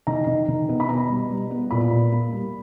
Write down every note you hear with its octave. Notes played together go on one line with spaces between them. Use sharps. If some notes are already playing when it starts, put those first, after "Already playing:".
D#3 A#5
D#3
D#3
B3
B5
B2 A#5
G3
G3
B3
A#2 B5
A#3
A#3
G3